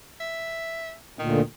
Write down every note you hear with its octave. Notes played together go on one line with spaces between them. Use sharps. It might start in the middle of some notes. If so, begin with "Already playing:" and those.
E5
D2 A#2 D#3